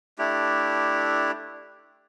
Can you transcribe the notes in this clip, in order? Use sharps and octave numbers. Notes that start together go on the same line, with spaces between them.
A3 D4 E4 G4